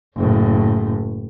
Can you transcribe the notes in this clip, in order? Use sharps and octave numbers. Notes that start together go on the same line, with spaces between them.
F#1 A2